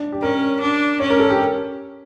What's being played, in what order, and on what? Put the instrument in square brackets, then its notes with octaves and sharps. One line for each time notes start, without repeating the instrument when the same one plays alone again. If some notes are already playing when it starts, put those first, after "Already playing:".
Already playing: [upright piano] D4
G4
[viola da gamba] C#4 [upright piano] A#4
[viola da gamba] D4
[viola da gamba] C#4 [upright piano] C#5
[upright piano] A#4
A4
G4